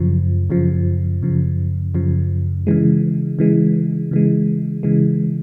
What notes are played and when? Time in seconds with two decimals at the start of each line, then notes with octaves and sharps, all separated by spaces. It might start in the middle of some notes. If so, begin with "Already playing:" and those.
Already playing: F#2 C#3 F3
0.50 F#2 C#3 F3
1.22 F#2 C#3 F3
1.95 F#2 C#3 F3
2.67 C#3 E3 G#3
3.39 C#3 E3 G#3
4.11 C#3 E3 G#3
4.83 C#3 E3 G#3